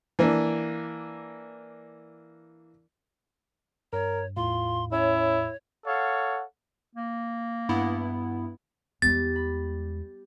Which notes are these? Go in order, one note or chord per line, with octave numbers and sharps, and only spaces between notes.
E3 A#3 D4
G2 A#4 C#5
E2 A2 F4 C6
C#4 E4 C#5
A4 C#5 F5 F#5
A#3
G2 B3 E4
E2 G3 G#3 B3 G4 A6
B5